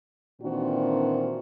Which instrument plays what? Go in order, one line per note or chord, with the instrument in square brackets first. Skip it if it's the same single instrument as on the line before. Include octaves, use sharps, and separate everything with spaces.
[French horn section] A#2 D#3 E3 C4 D4 F#4